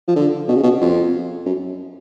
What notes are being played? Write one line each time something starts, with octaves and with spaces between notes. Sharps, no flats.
F3
D3
B2
C#3
B2
F2
F#2